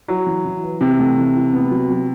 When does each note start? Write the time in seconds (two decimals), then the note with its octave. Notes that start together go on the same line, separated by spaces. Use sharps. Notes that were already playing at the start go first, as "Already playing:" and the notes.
0.08 F#3 E4
0.26 E3
0.45 E3
0.63 B4
0.81 C3 E3
0.99 A3
1.17 E3
1.36 E4
1.53 B3
1.71 F#3
1.90 F#3